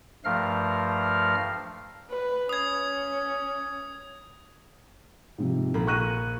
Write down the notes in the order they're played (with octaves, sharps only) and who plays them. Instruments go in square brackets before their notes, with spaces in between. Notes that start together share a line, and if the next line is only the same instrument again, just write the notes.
[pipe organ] G2 F3 A3 A#4 F5 F6
[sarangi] B4
[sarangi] C#4 [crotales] D#6 G#6
[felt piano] G#2 C3 F3
[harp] A#1 B5 [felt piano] A4
[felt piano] C#6 F#6 D#7